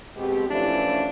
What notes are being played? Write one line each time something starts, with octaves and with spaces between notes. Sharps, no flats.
B2 G#3 C4 G4
E3 F3 A3 C#4 D4 E4